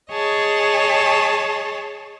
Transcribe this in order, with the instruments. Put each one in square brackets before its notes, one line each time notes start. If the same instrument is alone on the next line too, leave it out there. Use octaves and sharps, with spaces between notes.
[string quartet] G#4 C#5 D#5 A5